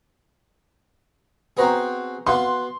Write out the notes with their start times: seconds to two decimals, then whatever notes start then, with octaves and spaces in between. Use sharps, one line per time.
1.57 B3 C4 F#4 G#4 C5 A#5
2.27 B3 F#4 F5 C6